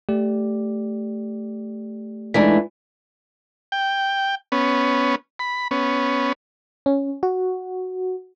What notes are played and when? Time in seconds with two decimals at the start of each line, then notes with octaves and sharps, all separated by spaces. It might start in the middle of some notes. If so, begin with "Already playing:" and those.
0.09 A3 G4 D5
2.34 E3 G#3 A3 D4 D#4 B6
3.72 G5
4.52 B3 C#4
5.39 B5
5.71 B3 C#4
6.86 C#4
7.23 F#4